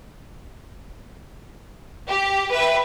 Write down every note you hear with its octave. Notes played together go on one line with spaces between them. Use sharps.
G4
B4 E5 G5